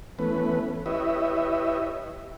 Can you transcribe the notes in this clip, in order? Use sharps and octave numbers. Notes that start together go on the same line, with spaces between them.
E3 A3 B3 C#4 B4
E4 G4 B4 C#5 D#5 E5